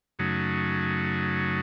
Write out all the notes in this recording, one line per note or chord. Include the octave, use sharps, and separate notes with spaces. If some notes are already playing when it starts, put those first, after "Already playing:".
F#2 C#3 F#3 A3 D#4